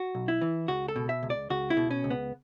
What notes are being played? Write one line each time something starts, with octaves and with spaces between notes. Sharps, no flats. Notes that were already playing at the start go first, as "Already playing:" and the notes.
Already playing: F#4
B1
E4
E3
C#2 F#4
A4
B2
E5
C#2
D5
C#2 F#4
E4
B2
C#4
C#2
B3